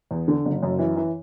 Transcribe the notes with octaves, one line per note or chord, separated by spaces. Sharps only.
E2
D3
F#1
F#2
E3
E3